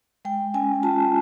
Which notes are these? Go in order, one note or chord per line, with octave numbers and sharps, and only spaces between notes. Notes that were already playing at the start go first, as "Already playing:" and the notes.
G#3 G5
C#4 G#5
F4 A5